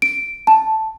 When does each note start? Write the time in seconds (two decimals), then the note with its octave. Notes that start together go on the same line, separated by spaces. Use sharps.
0.02 D7
0.47 A5